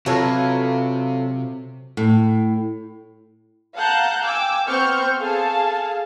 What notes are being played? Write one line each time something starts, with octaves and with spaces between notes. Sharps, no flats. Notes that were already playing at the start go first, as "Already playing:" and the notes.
C3 F#3 F4 A4 B4 C#5 F5
A2
F5 F#5 A5 A#5 F#6 G6
G5 G#5 D6 E6
B3 C4 C5 C#6 F6 G6
G#4 A4 F5 A5